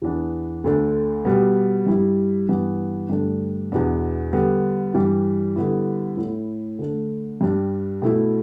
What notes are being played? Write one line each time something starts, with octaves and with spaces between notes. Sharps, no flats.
E2 E3 B3 D4
D2 D3 A3 D4
B2 G3 B3
G2 G3 E4
G2 E3 B3
G2 D3 A3 D4
E2 B2 B3 D4
D3 G3 B3
G2 E3 G3
D3 G3 B3 E4
A2 A3 E4
D3 A3 D4
G2 G3 D4
B2 A3 E4